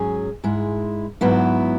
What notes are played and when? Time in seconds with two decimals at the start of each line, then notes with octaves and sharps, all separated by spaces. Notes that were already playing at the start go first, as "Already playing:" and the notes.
Already playing: G#2 F#3 C#4 G#4
0.44 G#2 G#3 E4
1.21 G#2 F#3 B3 E4